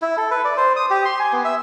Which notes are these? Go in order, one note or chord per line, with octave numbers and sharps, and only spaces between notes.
E4
A4
B4
D5
C5
D#6
G4
C6
G#5
B3
E5